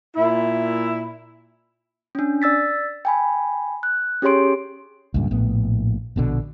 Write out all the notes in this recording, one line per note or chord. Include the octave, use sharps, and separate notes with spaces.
A#2 E4
C#4 D4
D5 E6 A6 B6
G5 G#5 B5
F#6
C#4 G4 G#4 C#5 C6 D7
C#2 G2 A#2
A#1 A2 B3
A#1 B2 D3